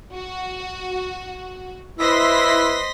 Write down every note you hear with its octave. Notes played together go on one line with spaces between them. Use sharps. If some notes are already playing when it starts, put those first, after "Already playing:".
F#4
E4 B4 C5 D#5 C6 A#6 B6